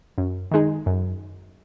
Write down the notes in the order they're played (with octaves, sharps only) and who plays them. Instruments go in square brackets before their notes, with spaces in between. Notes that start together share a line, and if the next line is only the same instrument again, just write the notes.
[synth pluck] F#2
D#3 G#3 D#4 G#4
F#2